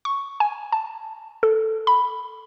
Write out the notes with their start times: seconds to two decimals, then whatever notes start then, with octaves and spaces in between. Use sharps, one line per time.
0.05 C#6
0.40 G#5
0.72 A5
1.43 A4
1.87 B5